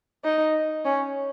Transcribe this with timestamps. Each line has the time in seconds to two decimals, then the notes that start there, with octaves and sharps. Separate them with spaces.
0.24 D#4
0.85 C#4